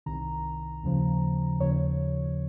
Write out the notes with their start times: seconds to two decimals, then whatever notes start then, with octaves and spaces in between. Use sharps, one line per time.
0.06 C2 C3 D#3 A#5
0.83 D#2 C#3 F3
1.60 D#2 C#3 F3 C#5